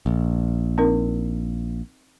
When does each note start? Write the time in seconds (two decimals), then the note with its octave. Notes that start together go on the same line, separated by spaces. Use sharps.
0.06 A#1
0.78 C4 D#4 A#4